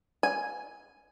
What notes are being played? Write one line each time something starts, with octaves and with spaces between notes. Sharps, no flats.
G#5